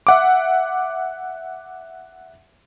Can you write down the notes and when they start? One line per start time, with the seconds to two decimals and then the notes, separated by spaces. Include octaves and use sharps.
0.07 E5 F#5 D6